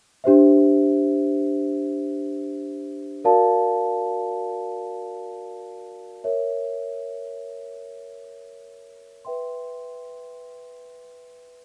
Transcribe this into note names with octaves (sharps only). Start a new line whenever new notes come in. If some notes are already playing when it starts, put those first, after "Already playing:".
D4 G4 C5 E5
F#4 A#4 D5 F5 A5
A#4 C#5 E5
B4 E5 G5 C6